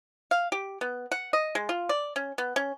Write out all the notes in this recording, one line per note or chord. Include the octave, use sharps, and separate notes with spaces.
F5
G4
B3
F#5
D#5
G#3
F4
D5
C#4
B3
C#4